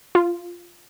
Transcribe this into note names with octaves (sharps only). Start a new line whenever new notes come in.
F4